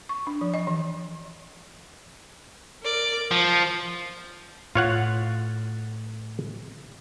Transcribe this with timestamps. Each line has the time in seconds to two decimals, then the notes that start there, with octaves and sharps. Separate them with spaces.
0.09 C#6
0.27 D4
0.41 F3
0.54 D#5
0.67 E3
2.81 A#4 D5 D6
3.31 F3 C5
4.75 A2 F4 C#5 F#5